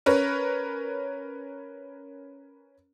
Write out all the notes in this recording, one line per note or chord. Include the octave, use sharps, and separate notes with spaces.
C#4 A#4 B4 C#5